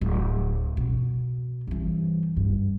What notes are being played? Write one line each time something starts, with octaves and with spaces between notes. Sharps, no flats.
D1
B2
G2 E3
G2